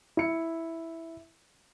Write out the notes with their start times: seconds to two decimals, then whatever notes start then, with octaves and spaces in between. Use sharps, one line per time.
0.17 E4 C#7